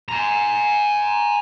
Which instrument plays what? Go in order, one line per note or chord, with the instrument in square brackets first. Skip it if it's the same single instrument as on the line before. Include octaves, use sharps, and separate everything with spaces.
[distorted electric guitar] G#5 A#5